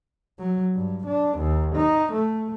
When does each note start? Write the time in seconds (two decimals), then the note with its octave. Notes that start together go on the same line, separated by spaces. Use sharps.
0.39 F#3
0.75 G2
1.06 D4
1.39 D#2
1.75 D#4
2.13 A3